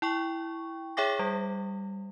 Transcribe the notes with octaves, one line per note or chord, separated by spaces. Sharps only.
E4 G5 C#6
G#4 C#5 E5 G5 D6 A#6
G3